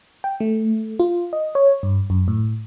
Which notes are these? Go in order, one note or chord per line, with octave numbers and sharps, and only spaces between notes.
G5
A3
F4
D#5
C#5
G2
F#2
A2